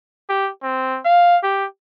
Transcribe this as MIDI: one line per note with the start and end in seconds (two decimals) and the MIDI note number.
0.29 0.50 67
0.63 0.99 60
1.05 1.37 77
1.43 1.65 67